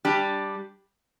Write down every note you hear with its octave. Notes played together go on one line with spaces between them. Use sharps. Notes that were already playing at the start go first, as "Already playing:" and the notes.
G3 D4 G4